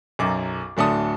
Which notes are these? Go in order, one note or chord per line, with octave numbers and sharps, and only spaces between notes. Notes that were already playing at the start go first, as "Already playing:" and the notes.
B1 F#2 D6
D1 D3 A3 A5 D#6